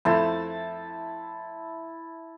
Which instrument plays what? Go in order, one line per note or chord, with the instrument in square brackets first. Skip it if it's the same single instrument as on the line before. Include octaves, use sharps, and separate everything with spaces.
[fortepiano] F2 A3 C5 [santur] E4 A5